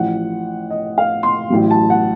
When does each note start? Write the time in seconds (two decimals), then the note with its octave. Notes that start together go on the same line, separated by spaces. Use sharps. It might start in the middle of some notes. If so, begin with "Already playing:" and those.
Already playing: A1 A2 F3 F#5
0.70 D#5
0.98 F5
1.23 C6
1.50 A1 A2 F#3
1.71 A5
1.90 F#5